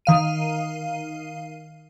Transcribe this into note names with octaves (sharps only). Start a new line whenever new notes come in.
D#3 F5 D#7